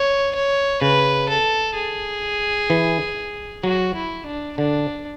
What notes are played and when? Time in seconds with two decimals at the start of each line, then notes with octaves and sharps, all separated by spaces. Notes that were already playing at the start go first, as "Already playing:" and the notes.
Already playing: C#5
0.35 C#5
0.82 C#3 B4
1.29 A4
1.75 G#4
2.70 E3
3.64 F#3 F#4
3.95 E4
4.26 D4
4.57 D3 D4